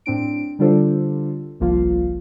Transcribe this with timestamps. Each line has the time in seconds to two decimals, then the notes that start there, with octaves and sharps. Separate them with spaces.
0.06 A2 C4 D4 D7
0.59 D3 G3 D4 F4 A4 C5
1.60 G1 C2 F3 A#3 F4 F5